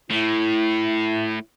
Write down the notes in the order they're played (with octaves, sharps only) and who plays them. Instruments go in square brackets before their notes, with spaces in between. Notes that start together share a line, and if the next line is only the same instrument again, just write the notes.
[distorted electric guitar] A2 [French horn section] E4